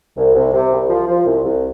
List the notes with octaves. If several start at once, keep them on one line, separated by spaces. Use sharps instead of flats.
C2
C2
C3
C2
F3
F3
C2
C2